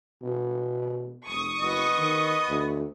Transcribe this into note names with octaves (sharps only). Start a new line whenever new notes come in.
B2
F1 C#6 D#6
F#1 B3 D#5
D#3
D2